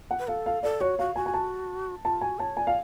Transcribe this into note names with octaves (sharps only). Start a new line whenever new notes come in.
F#5
B4
A4 F5
F5
A4 D5
F#4 C#5
F#4 F5
F#4 G#5
G#5
A5
F4 A5
F#4 G#5
C#5 A5
D5 G#5
F5